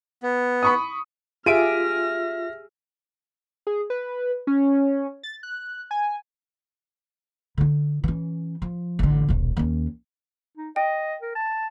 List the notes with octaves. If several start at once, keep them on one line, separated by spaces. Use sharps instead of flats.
B3
B5 C#6 D#6
F4 G4 G#4 E5 F6 A#6 D7 D#7
G#4
B4
C#4
A6
F#6
G#5
D3 D#4
E3 C#4
F3
A1 D3
D#1 B1
D#2 C#4
D#4
D#5 G5
A#4
A5